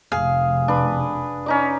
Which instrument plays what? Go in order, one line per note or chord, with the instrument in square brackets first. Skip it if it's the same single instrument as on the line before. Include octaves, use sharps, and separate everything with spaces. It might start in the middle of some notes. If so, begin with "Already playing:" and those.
[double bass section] F1 [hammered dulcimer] G#4 [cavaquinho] F5
[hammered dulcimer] D4 B4
C#4 D#4 D5